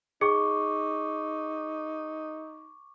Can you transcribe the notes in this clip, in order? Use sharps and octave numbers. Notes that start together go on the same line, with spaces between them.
D#4 G#4 C#6 D6